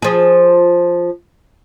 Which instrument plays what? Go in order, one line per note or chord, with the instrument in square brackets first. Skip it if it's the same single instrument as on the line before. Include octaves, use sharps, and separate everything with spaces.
[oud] F3 G#4